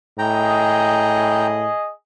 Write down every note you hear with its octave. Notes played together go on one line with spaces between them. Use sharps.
A2 G#4 D#5 G5 A#5